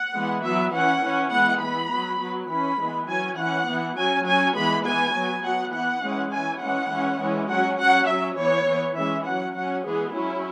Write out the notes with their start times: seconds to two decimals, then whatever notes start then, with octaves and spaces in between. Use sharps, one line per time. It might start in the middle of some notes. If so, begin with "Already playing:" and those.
Already playing: F#5
0.14 E3 G#3 B3
0.43 F#3 B3 E5
0.73 E3 C#4 F#5
1.03 E3 C#4
1.31 E3 G#3 B3 F#5
1.61 E3 B3 B5
1.90 F#3 B3
2.20 F#3 B3
2.50 E3 C#4 B5
2.79 E3 G#3 B3
3.08 F#3 C#4 G#5
3.37 E3 C#4 F#5
3.67 E3 B3
3.97 F#3 C#4 G#5
4.25 F#3 C#4 G#5
4.56 E3 G#3 B3 B5
4.84 E3 B3 G#5
5.15 F#3 B3
5.43 F#3 B3 F#5
5.73 E3 B3 F#5
6.03 E3 G#3 C#4
6.32 E3 C#4 G#5
6.61 E3 G#3 C#4 F#5
6.91 E3 G#3 C#4
7.21 E3 G#3 C#4
7.49 F#3 C#4 F#5
7.79 F#3 C#4 F#5
8.09 F#3 C#4 E5
8.38 E3 B3 C#5
8.67 E3 B3
8.97 E3 G#3 C#4 E5
9.26 F#3 C#4 F#5
9.55 F#3 C#4 F#5
9.86 E3 G#3 B3 G#4
10.14 F#3 C#4 E4